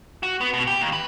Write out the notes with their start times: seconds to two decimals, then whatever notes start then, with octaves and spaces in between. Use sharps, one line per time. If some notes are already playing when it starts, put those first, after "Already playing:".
0.23 F#4
0.41 B3
0.53 B2
0.67 G4
0.81 D#2
0.93 B4